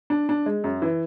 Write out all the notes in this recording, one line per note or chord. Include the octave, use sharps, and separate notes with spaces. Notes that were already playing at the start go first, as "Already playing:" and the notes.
D4
D4
G#3
F#2
E3